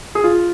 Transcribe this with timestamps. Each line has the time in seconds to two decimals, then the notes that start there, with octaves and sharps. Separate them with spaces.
0.15 G#4
0.24 F4